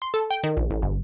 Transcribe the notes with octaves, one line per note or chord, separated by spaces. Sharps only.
C6
A4
G5
D#3
A#1
A1
G1